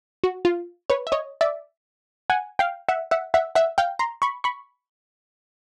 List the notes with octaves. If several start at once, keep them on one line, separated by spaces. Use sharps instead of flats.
F#4
F4
B4 C#5
E5
C#5 D#5
D5 E5
F#5 G#5
F5 G5
E5 F#5
E5 F#5
E5 F#5
E5 F#5
F5 G5
A#5 C6
B5 C#6
B5 C#6